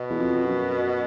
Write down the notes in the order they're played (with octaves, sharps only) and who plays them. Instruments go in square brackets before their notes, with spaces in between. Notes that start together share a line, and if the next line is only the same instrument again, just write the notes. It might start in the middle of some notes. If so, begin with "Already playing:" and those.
Already playing: [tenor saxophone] B2
[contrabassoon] E2
F2
F#2